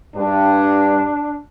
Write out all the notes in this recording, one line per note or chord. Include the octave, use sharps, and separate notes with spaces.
G2 D4